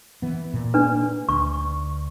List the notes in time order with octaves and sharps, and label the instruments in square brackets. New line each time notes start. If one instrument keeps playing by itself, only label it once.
[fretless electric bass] E3 B3
A#2
[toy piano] D4 B4
[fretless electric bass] D2 [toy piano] C#6